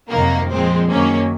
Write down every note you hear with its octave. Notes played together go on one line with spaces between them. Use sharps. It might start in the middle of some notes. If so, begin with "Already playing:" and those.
F2 C3 D#3 F#3 A#3
A#2 F3 G#3 C4
F#2 D#3 F#3 A#3 C#4